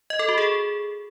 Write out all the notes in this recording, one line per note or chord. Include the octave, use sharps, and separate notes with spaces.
D#5
A4
F#4
G#4